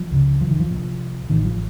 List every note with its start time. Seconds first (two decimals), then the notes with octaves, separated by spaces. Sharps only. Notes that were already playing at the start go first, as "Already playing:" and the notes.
Already playing: F3
0.11 C#2 C#3
0.41 F3
0.51 D#3
0.60 F3
0.70 C2 A#2
1.30 A1 A2 D#3
1.45 F3